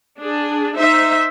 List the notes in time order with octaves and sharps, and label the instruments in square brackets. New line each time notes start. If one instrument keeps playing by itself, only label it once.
[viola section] D4 G#4
D#4 C5 E5